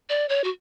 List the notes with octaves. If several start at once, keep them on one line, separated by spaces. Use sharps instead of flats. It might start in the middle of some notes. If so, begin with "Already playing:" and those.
D5
C#5
F#4